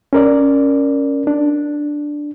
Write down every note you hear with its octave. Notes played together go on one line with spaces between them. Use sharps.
C#4 A#4 D5
D4